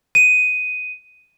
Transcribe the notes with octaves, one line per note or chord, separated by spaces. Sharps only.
D#7